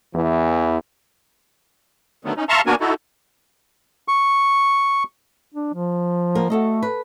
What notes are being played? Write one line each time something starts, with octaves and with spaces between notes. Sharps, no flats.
E2 E3
D3 D#3 F#3 A3 B3
C#4 D#4
E5 F5 A5 A#5 C6 C#6
A#3 B3 D4 F#4 A#4 G#5
D#4 E4 F#4 A4
C#6
D4
F3
A#3 B3 A#4
A3 F#4 A4 D#5
B4